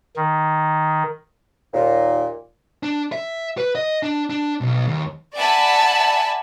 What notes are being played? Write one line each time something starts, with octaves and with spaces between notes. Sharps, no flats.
D#3
D#2 A#2
D4
E5
B4
D#5
D4
D4
B1
D#2
D5 E5 F#5 G#5 A5 B5